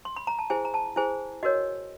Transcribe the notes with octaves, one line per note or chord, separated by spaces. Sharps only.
C6
B5
A#5
A5
E4 G#4 C5 G#5
A#5
A5
E4 G#4 C5 G#5
F#4 A#4 C#5 D#5